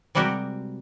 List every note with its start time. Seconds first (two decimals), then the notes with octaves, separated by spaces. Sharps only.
0.15 C3 G3 G#3 F#4 G4 A#4